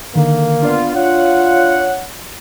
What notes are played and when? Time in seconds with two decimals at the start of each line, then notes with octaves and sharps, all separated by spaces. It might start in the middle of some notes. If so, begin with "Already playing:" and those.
0.15 D3 D#3 A#3
0.63 B3 D4 F4 D5 F5
0.95 F4 C#5 F#5